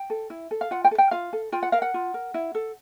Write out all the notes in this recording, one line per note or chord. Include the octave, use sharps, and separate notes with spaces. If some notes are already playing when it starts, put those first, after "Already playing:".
Already playing: G5
A4
E4
A4
F5
F4 F#5
G5
A4
G5
F4 F5
A4
F4 G5
F#5
A#4 F5
F#5
F4
A#4
E4
A4